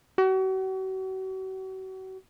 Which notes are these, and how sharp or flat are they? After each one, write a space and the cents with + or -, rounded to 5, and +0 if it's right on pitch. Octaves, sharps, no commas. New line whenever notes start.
F#4 +40